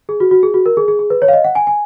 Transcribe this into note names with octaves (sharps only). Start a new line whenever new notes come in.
G#4
F#4
F#4
G#4
F#4
A#4
G#4
G#4
G#4
B4
C#5
F5
D#5
F#5
G#5
G#5